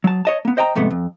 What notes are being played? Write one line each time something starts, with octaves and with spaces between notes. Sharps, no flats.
F#3 A5
C#5 D#5 A5
A#3 B3
C5 D#5 G5 A5 A#5
F2 G#2 C3 A3 B3
F2